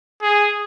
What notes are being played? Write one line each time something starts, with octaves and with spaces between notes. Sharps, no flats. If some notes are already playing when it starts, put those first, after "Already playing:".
G#4